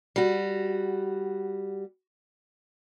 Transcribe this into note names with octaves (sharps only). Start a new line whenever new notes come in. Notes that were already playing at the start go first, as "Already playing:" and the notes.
G3 F#4